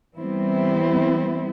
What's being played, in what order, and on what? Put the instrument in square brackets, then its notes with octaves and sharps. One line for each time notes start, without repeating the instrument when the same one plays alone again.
[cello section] E3 G3 B3 C4 E4